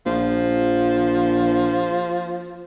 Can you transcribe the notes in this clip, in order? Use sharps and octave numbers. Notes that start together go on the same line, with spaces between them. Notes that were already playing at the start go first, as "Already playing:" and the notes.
A#1 F3